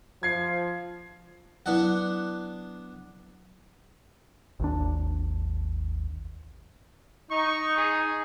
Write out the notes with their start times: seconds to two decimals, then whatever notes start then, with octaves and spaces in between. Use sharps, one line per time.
0.23 F3 G#6 C7
1.66 F#3 B3 D4 E4 F#5
4.60 G#1 D#2 D4
7.31 D#4 C#6
7.77 G#4